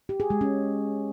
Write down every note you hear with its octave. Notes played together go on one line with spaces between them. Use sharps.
G4
G#4
G#3
C#4